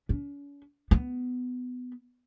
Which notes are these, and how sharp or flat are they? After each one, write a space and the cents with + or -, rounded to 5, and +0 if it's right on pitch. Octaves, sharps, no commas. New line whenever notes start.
C#4 +45
B3 +15